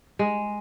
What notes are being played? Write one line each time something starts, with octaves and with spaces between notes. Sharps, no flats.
G#3